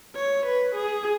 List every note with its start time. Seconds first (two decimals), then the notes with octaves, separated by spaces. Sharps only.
0.16 C#5
0.46 B4
0.75 G#4